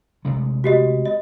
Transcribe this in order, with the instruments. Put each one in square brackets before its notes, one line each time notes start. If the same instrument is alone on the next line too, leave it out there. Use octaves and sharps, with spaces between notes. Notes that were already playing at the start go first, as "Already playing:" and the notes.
[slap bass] C3 G#3 A3
[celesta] F#4 G4 D#5
D#5